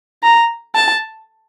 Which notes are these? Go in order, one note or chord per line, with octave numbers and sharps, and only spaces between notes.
A#5
A5